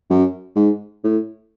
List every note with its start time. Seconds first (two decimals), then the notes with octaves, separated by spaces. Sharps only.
0.10 F#2
0.56 G#2
1.04 A2